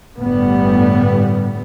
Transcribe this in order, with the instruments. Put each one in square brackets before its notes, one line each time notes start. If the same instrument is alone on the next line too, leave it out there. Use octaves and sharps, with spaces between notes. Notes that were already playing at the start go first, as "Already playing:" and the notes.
[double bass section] G1 A2 G3 B3